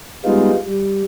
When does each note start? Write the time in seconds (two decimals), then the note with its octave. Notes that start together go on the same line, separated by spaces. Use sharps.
0.25 G3 G#3 B3 D#4 F4
0.66 G3